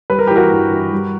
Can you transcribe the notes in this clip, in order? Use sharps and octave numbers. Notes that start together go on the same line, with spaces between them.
G3 B4
A#4
E3 G4
F#4 A#4
G2
E3
G3